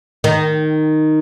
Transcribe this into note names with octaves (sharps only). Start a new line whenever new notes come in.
D#3